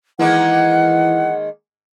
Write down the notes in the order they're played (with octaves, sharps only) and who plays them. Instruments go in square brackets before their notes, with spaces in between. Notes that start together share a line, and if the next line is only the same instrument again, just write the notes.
[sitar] D#3 G#3 A#3 [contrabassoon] E3 [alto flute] F#5